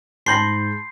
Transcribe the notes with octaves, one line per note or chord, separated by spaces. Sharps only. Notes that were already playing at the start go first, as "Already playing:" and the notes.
G#2 A5 B5 C6 G6 A#6 C7